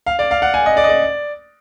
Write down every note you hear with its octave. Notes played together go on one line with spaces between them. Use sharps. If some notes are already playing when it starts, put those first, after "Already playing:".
F5
D5
F5
F#5
G#5
D#5
D5
D#5
D5